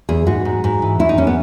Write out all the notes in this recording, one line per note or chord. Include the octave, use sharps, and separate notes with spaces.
E2 G#4
G#2 F#4
G#2
G#2
E3
E2 E4
D#4
E2 C#4
B3